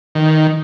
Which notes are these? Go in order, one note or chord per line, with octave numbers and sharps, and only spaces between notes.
D#3